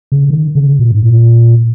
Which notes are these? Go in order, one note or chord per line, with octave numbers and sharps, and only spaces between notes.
C#3
D#3
C#3
A#2
G#2
A#2